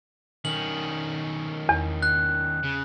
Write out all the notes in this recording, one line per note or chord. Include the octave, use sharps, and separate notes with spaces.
D#3 C#4 F#7
E2
F#6
C#3